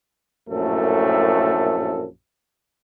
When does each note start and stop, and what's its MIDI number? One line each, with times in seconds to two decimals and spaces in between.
0.49 2.04 34
0.49 2.04 42
0.49 2.04 45
0.49 2.04 57
0.49 2.04 69